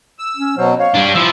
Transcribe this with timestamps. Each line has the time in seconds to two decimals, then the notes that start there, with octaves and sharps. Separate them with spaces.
0.19 E6
0.36 C#4
0.57 B2 F#3 C5
0.79 C#5 F5
0.95 G3 D4
1.15 F3 E4 E6